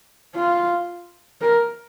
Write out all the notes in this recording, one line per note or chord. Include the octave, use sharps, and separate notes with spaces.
F4
A#4